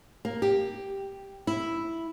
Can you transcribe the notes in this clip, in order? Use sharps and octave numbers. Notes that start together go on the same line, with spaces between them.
A#3
G4
E4